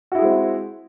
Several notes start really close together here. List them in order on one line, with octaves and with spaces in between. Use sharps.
F#4 E4 G#4 G#3 C4